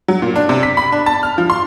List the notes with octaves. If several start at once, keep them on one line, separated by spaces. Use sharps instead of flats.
F#3
A#2
D4
C3
B6
B5
D4
A5
F6
F3
C6